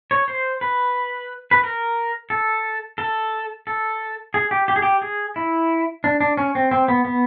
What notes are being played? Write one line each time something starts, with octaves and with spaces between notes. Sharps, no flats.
C#5
C5
B4
B4
A#4
A4
A4
A4
G#4
G4
G4
G#4
G4
G#4
E4
D4
D4
C#4
C4
C4
B3
B3